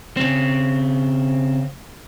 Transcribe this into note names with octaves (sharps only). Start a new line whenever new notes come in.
C#3 C4